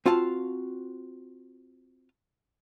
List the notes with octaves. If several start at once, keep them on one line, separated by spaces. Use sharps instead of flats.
C4 F4 F#4 F5 A5